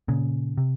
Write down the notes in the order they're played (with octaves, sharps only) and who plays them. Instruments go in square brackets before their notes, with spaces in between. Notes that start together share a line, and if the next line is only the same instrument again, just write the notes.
[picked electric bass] A#2 C#3
C3